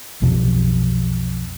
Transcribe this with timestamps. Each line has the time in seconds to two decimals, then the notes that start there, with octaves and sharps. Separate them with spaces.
0.22 B1 F2 C3